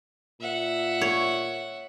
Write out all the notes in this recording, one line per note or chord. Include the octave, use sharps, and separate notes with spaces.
A#2 E5 F#5
C#5